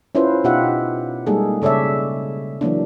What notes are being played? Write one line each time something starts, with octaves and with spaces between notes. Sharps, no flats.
C#4 E4 F4 B4 C5
B2 D#4 F4 G4 E5 F#5
G3 G#3 A#3 D#4 G#4 A4
C#3 A4 C#5 D5 E5
E3 F#3 A#3 D4